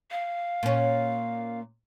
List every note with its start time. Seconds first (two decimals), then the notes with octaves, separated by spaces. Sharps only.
0.11 F5
0.63 A#2 C#4